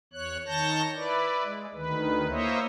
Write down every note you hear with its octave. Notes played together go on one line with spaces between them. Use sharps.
E2 C#5 F#6
D#3 C#5 A5 G6 A#6
E4 B4 D5
G#3
D2 D#3 B4
A#3 E4 C5 C#5 D#5 E5